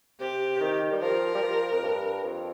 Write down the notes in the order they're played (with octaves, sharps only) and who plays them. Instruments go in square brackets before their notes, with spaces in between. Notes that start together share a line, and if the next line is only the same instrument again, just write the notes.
[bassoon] C3 [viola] G4
[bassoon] C3
D#3
G3
[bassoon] F3 [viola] A#4
[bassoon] G3
F3
F2
G2
F2